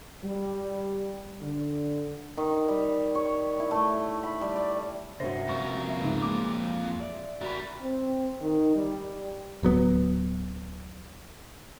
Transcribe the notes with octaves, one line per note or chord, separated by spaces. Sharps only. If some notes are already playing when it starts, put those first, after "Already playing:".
G3
D3
D#3
G3
C#5
E4
A3
B5
G3
D5
C2 G2 C#4 F#4 C5 E5 A#6
F2 A#4 C#6 A#6
C#2 G#2
A#2 G#3 C4 D6
D5 E5
G3 F#4 A#4 B5
C4
D#3
G3
D1 F#3 B3